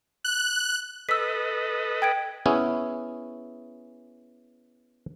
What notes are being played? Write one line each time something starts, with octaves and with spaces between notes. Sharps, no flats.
F#6
A4 B4 D#5 E6 B6
G5 G#6 D7
B3 C#4 E4 G#4